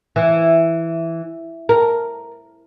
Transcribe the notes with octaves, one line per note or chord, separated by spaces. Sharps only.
E3
A#4